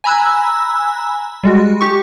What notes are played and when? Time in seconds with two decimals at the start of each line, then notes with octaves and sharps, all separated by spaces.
0.04 G#5 A#5 B5 E6 F#6
1.43 G3 G#3 F#4
1.81 G4 C#6